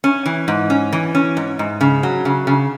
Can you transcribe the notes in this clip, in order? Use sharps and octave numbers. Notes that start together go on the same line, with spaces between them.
C#4
E3
G#2
C#4
E3
C#4
G#2
G#2
C#3
F#3
C#3
C#3